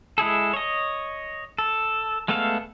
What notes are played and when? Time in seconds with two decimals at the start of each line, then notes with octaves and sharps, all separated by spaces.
0.18 G#3 E4 G#4 A4
0.53 C#5 D#5
1.58 A4
2.28 G#3 A3 B3 A4 F5